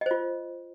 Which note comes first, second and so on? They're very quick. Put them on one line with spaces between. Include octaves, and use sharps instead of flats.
D#5 C5 F4